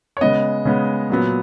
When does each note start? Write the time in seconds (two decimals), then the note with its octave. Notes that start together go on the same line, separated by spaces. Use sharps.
0.17 C#5
0.21 C#3 G#3 B3 D#5
0.65 C#3 G#3 B3
1.10 A#2 F#3 B3